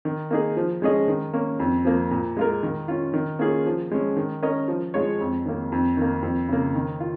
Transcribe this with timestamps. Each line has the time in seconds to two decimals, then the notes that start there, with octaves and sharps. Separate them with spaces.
0.05 D#3
0.31 A#3 D#4 G#4
0.57 F3
0.82 G#3 C#4 G#4 D#5
1.08 D#3
1.33 A#3 C#4
1.60 F2
1.85 F3 A#3
2.11 A#2
2.37 G#3 F4 A#4
2.63 D#3
2.88 C#4 F4
3.14 D#3
3.39 A#3 C#4 F4 G#4
3.66 F3
3.91 G#3 C#4
4.17 D#3
4.42 C#4 A#4 D#5
4.68 F3
4.94 G#3 F4 C#5
5.20 F2
5.46 D#3 A#3
5.72 F2
5.97 D#3 A#3
6.23 F2
6.48 C#3 A#3
6.75 D#3
7.00 F4